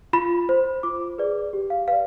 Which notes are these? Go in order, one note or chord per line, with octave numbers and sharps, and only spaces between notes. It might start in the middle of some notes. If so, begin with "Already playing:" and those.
F4 B5
C5
F4 D6
G#4 B4 D5
G4
F5
B4 D5 F5